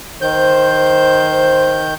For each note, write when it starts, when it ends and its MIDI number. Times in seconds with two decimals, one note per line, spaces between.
0.21 1.94 51
0.21 1.81 72
0.21 1.94 91